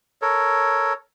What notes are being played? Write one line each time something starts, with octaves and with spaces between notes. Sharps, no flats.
A4 A#4 C#5